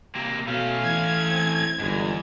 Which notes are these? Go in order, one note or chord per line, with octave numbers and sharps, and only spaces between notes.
C3 A#3
B2 A3 C#4 F5
E3 G#6
C4
G1 E2 G#2 G#3